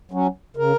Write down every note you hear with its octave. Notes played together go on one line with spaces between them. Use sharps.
F#3 C#4
C#3 A#4